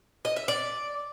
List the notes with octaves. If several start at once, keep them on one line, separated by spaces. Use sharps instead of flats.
D#5
E5
D5